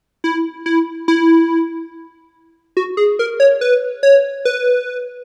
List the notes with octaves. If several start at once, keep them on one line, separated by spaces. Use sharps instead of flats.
E4
E4
E4
F#4
G#4
A#4
C#5
B4
C#5
B4